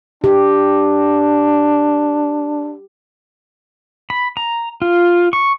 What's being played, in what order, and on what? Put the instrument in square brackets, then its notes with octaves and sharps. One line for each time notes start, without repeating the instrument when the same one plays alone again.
[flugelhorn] D4 [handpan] G4
[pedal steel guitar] B5
A#5
F4
C#6